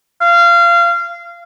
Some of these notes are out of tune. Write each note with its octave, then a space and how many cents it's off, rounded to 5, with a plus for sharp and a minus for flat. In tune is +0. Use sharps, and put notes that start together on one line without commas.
F5 -25